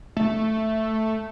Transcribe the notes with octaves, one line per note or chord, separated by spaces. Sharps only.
A3